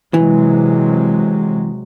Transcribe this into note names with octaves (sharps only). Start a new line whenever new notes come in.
C3 E3 F#3 G#3